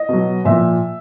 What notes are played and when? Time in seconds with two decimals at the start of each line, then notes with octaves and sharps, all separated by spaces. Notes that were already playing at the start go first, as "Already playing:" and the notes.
Already playing: D#5
0.09 B2 F#3
0.45 A#2 F3 E5